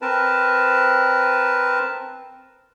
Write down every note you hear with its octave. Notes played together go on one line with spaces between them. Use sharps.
C4 A#4 B4 A5